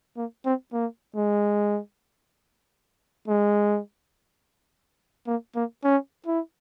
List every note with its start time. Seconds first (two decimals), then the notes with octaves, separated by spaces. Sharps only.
0.17 A#3
0.45 C4
0.73 A#3
1.16 G#3
3.28 G#3
5.27 A#3
5.55 A#3
5.84 C#4
6.27 E4